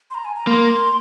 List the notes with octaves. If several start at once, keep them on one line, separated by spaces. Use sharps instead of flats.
C6
A#5
G#5
A#5
A#3 C6